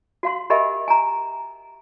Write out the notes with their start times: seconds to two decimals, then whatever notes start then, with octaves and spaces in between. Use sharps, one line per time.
0.23 F#4 F5 C6
0.50 G4 A#4 D#5 E5 G#5 B5
0.88 G#5 A#5